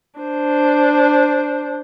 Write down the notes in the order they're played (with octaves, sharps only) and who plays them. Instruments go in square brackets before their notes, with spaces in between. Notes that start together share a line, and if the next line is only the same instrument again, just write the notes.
[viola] D4 C5